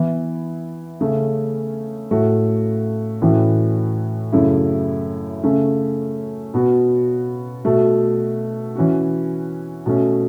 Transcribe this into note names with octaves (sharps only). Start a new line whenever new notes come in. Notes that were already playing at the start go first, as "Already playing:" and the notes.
Already playing: E3 B3 E4
C#3 A3 C#4
A2 A3 F#4
A2 E3 C#4 F#4
F#2 C#3 A3 E4
C#3 A3 C#4
B2 B3 F#4
B2 A3 F#4
E3 C#4 F#4
B2 A3 C#4